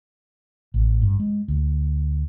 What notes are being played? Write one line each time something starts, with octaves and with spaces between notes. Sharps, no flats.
A1
G2
G#3
D2